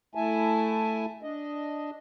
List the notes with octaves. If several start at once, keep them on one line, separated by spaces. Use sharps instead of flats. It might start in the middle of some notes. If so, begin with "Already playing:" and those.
A3 E4 E5 G#5 A5
D4 D#5